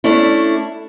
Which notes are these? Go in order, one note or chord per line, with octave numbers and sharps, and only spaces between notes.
A3 C#4 D4 E4